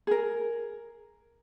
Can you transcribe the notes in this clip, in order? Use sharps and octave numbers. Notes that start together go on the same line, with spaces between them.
G#4 A#4